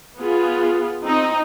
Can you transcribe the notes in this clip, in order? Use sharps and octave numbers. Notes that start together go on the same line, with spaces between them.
B3 F4 G#4
C4 D#4